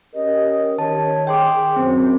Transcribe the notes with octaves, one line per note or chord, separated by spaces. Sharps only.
C#4 G4 A#4 D#5
D#3 C#5 A5
G#4 G5 C6 D6
F#2 C4 C5